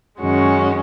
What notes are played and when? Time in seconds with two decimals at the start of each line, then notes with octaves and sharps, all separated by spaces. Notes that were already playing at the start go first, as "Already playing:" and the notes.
0.20 F#2 D#3 G#3 C#4 F#4